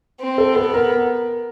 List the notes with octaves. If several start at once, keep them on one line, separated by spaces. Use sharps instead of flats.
C4
A4
B3 A4
A#4